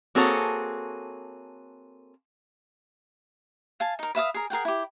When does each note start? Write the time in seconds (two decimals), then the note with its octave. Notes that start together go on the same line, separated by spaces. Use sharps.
0.15 A#3 C4 F#4 G#4 A4 C#5
3.80 F5 G#5 A5
3.99 D#4 A#4
4.15 B4 E5 F5 D#6
4.34 G#4 A#4
4.50 G#4 A#4 F#5 G5
4.65 E4 G4